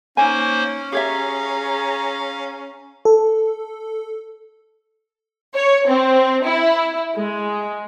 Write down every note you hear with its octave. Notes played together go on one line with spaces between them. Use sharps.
A#3 C#4 D#4 C5 C#5 G#5
G4 G#4 C#5 E5 F5 A#5
A4
C#5
C4
E4
G#3